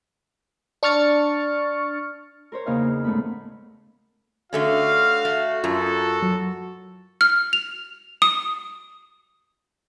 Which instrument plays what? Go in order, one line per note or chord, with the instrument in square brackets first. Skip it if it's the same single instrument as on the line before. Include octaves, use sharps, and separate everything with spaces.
[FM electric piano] D4 C#6 F6 A6 C#7
[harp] A#4 C5 C#5
E2 C#3 A#3 C#4 D#4 F5
G#2 C#3 A3 B3 B5
[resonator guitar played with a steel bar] D3 A3 C#4 [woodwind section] F#4 [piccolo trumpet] F5
[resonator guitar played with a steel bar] A3
[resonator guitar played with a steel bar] F#2 [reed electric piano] F4 [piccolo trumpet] A4
[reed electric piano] F#3
[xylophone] F6
F7
D#6